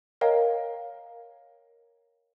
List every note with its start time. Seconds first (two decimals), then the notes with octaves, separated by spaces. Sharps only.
0.21 A#4 C#5 D#5 F5 G5 A#5